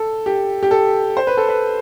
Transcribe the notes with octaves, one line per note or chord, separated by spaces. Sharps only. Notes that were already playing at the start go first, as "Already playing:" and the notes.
Already playing: A4
G4
G4
A4
C5
B4
A4
B4